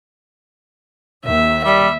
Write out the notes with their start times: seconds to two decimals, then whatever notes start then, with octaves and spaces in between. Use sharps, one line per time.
1.26 D#2 E5
1.65 G3 E5